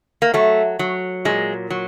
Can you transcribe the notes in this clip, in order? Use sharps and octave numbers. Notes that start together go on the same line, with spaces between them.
A#3
F#3 A3
F#3
A#2 G#3
F#3